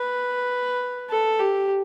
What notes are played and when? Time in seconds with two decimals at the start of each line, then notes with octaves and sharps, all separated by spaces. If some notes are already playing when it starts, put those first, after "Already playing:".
Already playing: B4
1.10 A4
1.40 G4